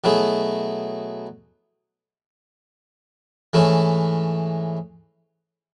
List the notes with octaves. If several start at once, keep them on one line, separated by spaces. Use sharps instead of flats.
B2 F#3 A3 E4 G#4
G#2 E3 A3 C#4 E4